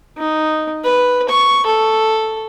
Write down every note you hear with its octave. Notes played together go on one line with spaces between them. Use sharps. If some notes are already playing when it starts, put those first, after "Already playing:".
D#4
B4
C#6
A4